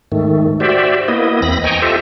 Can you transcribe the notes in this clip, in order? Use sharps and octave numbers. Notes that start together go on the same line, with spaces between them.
G#2 D#3 A3
F#4 G4 C5 D5 E5
A#3 B3 E4 D#5
E2 C4 B5 A#6
D#5 G5 G#5 A#5 C#6
F4 G4 A4 C5 E5